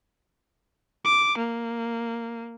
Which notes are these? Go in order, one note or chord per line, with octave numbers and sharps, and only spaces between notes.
D6
A#3